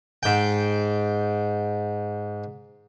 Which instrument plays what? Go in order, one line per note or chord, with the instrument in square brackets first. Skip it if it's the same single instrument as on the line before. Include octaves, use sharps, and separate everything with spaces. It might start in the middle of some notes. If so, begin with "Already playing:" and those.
[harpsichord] G#2 G5